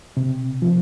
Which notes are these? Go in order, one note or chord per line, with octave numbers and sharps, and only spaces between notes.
C3
F3